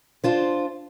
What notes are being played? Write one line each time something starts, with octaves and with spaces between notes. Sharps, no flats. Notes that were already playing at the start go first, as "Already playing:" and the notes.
D4 F4 C5